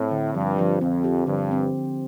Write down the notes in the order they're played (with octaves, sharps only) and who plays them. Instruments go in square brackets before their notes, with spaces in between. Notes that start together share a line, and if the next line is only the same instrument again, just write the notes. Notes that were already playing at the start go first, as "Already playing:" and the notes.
Already playing: [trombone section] A2 [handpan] C4
[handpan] D3
[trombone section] G2 [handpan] F3
[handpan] F3
[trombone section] F2 [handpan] C4
[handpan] G4
[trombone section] G2 [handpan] D3
[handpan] C4